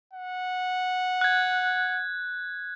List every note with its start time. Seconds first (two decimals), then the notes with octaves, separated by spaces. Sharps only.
0.13 F#5
1.21 F#6 G#6